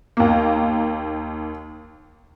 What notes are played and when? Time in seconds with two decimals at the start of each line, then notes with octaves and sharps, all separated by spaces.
0.17 D#2 A#3